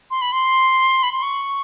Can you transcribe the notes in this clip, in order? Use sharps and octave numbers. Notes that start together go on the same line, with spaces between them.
C6
B5
C6
B5
C6
C#6